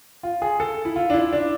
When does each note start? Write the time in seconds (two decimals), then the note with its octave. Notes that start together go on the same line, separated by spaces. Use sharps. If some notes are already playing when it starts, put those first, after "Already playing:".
0.23 F4
0.42 G#4
0.60 A4
0.85 E4
0.96 F4
1.10 D4
1.14 E4
1.33 D4